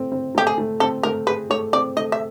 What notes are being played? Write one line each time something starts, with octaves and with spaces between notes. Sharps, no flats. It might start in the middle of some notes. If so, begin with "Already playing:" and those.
Already playing: A3 C4
C4
A3 G4
G#4
A3
C4 A4
A3 A#4
G#4 B4
A3 C#5
C4 D5
A3 D#5
E5